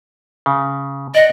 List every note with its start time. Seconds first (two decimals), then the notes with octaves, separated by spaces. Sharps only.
0.46 C#3
1.15 D5 D#5 F#5